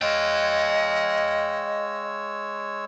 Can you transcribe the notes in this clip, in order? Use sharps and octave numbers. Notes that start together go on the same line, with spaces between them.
G#3 C#5 D#5 F5 G5 E6